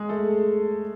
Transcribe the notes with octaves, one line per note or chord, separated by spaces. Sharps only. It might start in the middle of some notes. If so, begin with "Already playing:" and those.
Already playing: G#3 G#4
A3 A4